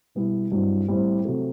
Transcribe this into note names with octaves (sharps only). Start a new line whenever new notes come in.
B2 G3 B3 E4
G2 F#3 C4 E4
A2 G3 C4 E4
C3 F#3 A3